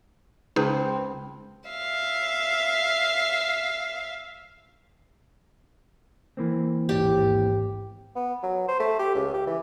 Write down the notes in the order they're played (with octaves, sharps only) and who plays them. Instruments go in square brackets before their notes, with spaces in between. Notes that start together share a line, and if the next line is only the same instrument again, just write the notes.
[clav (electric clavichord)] C#2 [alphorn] C4 [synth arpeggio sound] D#4 G#4 B4
[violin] E5 F5
[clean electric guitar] E3 A#3 C4
[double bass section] A1 D#2 G#2 [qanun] G4
[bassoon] B3
F#3
C5
A3
G4
C#2
G4
E3